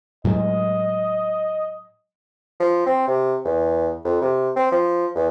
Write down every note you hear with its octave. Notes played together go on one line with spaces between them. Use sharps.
A2 F#3 G#3 D#5
F3
C4
C3
E2
F2
C3
C4
F3
E2